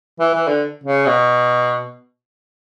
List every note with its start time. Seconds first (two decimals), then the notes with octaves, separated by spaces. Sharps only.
0.20 E3
0.34 E3
0.48 D3
0.84 C#3
1.06 B2